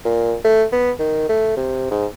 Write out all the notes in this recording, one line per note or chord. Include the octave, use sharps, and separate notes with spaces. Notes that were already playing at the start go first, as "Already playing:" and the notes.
A#2
A3
B3
D#3
A3
C3
G#2